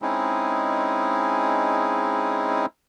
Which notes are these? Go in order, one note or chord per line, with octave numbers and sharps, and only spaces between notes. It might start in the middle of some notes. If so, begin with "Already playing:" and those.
G#3 C4 C#4 D#4 E4 G#4